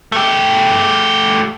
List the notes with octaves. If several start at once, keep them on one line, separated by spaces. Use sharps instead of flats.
A3 G4